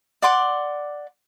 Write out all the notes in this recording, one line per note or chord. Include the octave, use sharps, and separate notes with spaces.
D5 F#5 C6 D6